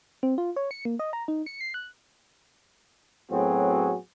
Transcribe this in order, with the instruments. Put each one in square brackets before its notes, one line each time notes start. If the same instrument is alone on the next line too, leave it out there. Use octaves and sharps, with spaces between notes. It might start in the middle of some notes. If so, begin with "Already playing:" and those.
[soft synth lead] C4
F4
C#5
C#7
A#3
D#5
A#5
D#4
C#7
C7
F#6
[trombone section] A2 F#3 B3 C4 F#4 G#4